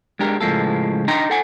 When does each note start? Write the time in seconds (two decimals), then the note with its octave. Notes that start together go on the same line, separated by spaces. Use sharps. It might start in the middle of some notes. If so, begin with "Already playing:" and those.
0.19 G#3 D4 G4 A#4
0.41 C#2 A2 F3 G#3 A#3 A4
1.08 D4 D#4 D#5 G5 A#5 C6
1.30 A4 F#5 G#5